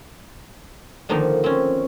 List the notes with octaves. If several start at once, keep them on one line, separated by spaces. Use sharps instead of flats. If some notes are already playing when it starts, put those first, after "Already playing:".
D3 D#3 F3 A#3 D#4
C4 C#4